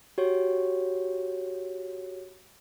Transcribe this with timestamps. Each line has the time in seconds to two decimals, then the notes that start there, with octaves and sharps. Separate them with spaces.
0.18 F#4 G4 C#5